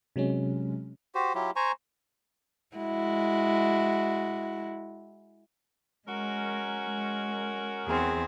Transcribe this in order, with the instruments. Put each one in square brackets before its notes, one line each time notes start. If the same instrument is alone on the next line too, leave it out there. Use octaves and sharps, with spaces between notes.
[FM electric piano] C3 F#3 G#3 C#4
[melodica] F#4 G4 C5
F#3 E4 F4 G4
C5 G#5 A#5 C#6
[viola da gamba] G#3 E4 F#4
[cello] G#3 [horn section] C#4 F#4 A#4
[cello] G#3
[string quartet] E2 C4 [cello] G#4